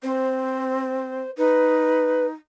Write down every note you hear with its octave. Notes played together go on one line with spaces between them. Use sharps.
C4 C5
D#4 B4